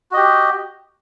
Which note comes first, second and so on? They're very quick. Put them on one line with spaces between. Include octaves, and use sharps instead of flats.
F#4 D#5 G4